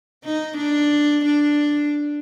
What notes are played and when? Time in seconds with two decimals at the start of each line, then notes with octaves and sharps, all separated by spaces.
0.24 D#4
0.57 D4
1.25 D4